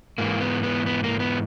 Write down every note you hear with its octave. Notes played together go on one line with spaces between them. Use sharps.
G#2 E3 A#3
B3
B3
B3
A#3
B3